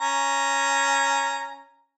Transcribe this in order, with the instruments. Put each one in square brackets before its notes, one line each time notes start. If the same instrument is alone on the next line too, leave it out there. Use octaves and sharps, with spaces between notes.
[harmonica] C#4 A#5